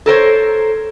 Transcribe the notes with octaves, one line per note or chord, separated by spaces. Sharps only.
A4 A#4 C5 C#5